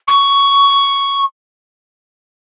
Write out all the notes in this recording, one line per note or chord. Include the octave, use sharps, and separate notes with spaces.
C#6